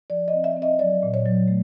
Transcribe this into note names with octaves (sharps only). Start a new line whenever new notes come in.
F3 D5
D#5
C4
E5
C4
D#5
F#3 D5
A#2
C#5
F#3
A3